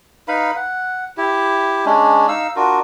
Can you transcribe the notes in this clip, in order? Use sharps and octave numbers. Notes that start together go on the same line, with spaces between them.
D#4 B4 F5 B5
F#5
E4 G4
G#3 C#4 D4
D#4 F5 E6
D4 F4 F#4 A#4